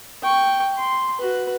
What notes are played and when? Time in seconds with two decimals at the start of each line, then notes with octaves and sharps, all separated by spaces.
0.23 G5 C#6
0.77 C6
1.19 F#4 B4